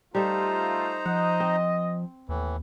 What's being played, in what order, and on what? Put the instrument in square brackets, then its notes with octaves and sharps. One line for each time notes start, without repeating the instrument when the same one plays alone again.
[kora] G3 A4 [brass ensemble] A3 F4 [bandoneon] D#4 C5 A#5
[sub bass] F3 [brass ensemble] D#5 [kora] F#5
[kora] C4
[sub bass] D#2 [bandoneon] A2 E3